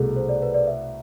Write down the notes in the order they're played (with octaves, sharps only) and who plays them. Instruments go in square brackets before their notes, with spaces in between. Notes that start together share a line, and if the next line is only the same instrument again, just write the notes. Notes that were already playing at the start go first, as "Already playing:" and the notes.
Already playing: [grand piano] C2 B2 A3 [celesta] G#4 A4
[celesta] C5
D5
B4
D5
E5